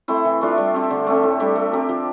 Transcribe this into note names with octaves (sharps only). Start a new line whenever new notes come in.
A3 C4 E4
E3
A3 D4 F4
G3
C4 G4
D3
A3 C4
A2
G3 D4 G4
A3
C4 G4 A#4
F3